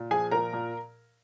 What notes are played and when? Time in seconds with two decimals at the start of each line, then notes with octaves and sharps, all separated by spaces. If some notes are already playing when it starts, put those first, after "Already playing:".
Already playing: A#2
0.11 F3 G#4 G#5
0.31 A#2 A#4 A#5
0.53 A#2